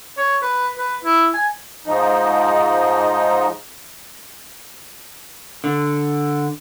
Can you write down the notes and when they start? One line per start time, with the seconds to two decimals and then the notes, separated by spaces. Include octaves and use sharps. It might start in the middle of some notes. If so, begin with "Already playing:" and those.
0.17 C#5
0.43 B4
0.79 B4
1.05 E4
1.34 G#5
1.86 G#2 F3 D#4
5.64 D3